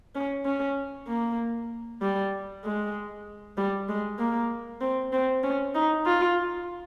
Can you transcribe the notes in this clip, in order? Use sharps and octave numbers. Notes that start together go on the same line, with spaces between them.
C#4
C#4
A#3
G3
G#3
G3
G#3
A#3
C4
C4
C#4
D#4
F4